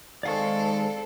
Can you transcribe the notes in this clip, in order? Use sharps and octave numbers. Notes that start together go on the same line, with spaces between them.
D#3 G#3 C4 A4 D5 F5 C#6